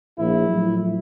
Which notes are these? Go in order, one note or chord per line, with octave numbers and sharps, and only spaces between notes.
A#1 E4
A2 F3 F#3